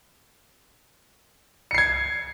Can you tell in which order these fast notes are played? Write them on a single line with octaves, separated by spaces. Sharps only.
C#7 C7 G#6